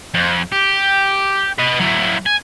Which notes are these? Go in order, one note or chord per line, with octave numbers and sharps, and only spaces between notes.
F2
G4
B4 D#5
F#3 E4
G#5